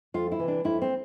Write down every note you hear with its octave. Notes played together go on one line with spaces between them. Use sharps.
F2 F4
E4
C3 E3
D4
F2 E4
C4